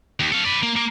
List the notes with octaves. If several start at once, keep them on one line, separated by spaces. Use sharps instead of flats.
D#2
A4 F5
B4 D5
A#3
A#3